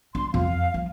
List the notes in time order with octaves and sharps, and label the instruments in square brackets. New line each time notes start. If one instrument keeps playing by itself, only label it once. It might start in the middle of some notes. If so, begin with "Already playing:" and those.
[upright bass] D4 [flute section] C6
[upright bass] F2 [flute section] F5
[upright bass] F3